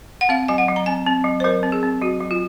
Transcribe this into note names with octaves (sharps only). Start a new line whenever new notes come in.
F#5
C4 F5
F#3 G#5
F#5
F#3
A#5
C4 G#5
C4
F#3
C5
F#3 A#4
C4
G#4
C4
F#3 F#4
F#3
F4